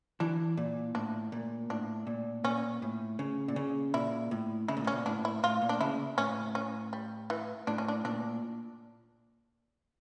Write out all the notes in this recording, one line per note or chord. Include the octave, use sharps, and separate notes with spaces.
E3 D4
A#2
A2 D4
A#2
A2 D4
A#2
A#2 C#4
A2
C#3
A#2
C#3
A#2 E4
A2
C#3 E4
A#2
A2
C#4
A#2
A2 D4
E4
A2 F4
A#2
D4
C#3 E4
A2 C#4
C#4
G3
E3
A2 D4
C#4
D4
A#2 D4